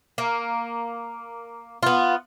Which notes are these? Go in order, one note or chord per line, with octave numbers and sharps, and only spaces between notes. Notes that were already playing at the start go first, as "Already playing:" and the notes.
A#3
B3 F4